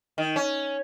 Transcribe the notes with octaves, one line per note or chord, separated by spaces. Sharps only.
D#3
C#4